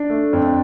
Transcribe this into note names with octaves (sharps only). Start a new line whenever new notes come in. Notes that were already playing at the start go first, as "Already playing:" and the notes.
Already playing: D4
A3
F2